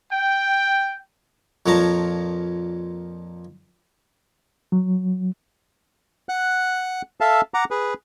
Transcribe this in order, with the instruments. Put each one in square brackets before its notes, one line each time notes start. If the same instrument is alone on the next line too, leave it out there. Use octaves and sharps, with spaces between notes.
[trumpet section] G5
[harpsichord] F2 A#2 F3 C#5 A5 A#5
[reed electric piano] F#3
[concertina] F#5 F#6
A4 E5 F5 A5
F#5 A#5 D6
G#4 B4